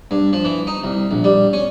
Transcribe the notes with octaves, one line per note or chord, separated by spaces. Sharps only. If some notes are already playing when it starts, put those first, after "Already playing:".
G2
F3
E3
D#4
C2
A#1
G3
C#4